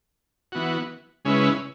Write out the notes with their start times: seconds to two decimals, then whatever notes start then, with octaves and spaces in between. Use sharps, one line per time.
0.52 E3 B3 F#4
1.25 C#3 G#3 C#4 E4 B4